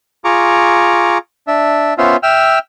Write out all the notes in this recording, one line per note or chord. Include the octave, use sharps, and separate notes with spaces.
F4 G#4 A#5 C#6 D6
D4 E5
B3 C#4 F4 C5 E5
E5 G5 E6 F6